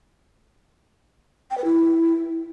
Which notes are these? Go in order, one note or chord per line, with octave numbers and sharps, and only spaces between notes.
G5
B4
E4